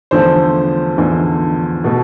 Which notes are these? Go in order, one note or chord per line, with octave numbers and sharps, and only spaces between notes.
E2 D3 F3 A3 C5
E2 D3 F3 A3
B2 A3